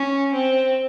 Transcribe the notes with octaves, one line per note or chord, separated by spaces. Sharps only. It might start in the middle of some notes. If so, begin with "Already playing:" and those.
Already playing: C#4
C4